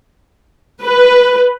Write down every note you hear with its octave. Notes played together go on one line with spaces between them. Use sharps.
B4